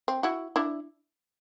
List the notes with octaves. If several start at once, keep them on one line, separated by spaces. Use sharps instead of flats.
C4
E4 F#4
D4 E4